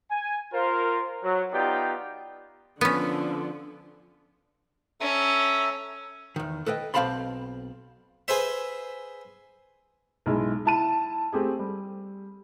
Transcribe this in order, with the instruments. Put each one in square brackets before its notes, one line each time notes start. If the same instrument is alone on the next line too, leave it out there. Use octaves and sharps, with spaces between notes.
[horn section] G#5
F4 A#4 C5
F#3
B3 D#4 F4 G4 D5 G5
[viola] D3 F3 [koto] B3 C#4
[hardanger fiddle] C#4 [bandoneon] A4 E5 A#5
[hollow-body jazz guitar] E2 D#3
A4 B4 D#5 G5
B1 C4 F5 A5 B5 C6
[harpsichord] G#4 B4 C5 E5
[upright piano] B1 G#3 E4
E4 A5 D#7
A3 C4 G4 G#4
G3